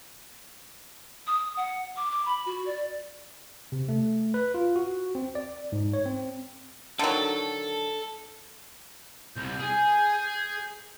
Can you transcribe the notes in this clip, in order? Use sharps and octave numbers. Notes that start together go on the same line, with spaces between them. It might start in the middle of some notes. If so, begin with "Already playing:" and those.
D#6
F#5
D6
D6
B5
F#4
D5
C3
A3
B4
F4
F#4
C4
D5
G#2
C#5
C4
D3 D#3 F#3 A4
C2 G6
G#4 G#5